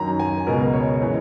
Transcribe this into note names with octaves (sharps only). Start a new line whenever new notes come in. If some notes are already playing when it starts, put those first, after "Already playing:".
Already playing: F#2 D#3 F#3 A#5
G#5
C#2 B2 G#3 A#4
C#5
C#3 E3 G#3